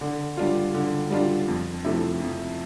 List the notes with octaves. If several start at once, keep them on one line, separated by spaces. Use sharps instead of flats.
D3
G3 D4 F4
D3
G3 D4 F4
F2
C3 F3 A3 E4
F2